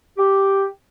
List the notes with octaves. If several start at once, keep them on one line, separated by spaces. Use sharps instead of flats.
G4